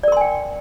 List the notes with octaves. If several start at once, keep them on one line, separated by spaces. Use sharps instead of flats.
A#4 D5 G5 G#5 C6